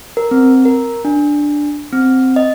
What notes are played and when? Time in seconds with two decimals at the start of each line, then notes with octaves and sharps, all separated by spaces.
0.17 A#4
0.31 C4
0.65 A#4
1.05 D4
1.93 C4
2.36 D#5